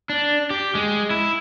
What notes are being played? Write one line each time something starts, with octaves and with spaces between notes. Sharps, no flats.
D4
G4
G#3
E4